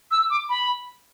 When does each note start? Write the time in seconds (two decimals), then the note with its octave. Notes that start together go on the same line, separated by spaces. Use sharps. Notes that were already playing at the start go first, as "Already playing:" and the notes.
0.11 E6
0.30 D6
0.49 B5